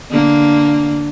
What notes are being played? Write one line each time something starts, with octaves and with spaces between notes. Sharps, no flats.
D3 A#3